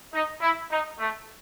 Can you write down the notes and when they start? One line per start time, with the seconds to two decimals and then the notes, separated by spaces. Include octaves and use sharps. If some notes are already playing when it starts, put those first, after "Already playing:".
0.13 D#4
0.42 E4
0.71 D#4
0.99 A3